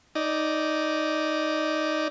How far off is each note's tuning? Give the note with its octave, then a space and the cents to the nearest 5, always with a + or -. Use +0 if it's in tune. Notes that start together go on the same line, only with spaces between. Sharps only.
D#4 +0 D5 -5